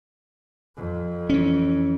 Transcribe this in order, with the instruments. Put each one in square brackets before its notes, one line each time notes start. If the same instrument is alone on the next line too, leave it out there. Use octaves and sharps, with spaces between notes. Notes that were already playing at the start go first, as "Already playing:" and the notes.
[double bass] F2
[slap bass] E3 C#4